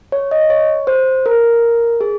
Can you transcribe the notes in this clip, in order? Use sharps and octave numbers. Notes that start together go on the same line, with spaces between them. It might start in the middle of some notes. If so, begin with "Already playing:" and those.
C#5
D#5
C#5
C5
A#4
G#4